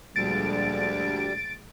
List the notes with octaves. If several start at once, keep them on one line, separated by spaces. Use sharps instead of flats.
D2 A#2 F3 G3 G#3 A6 D7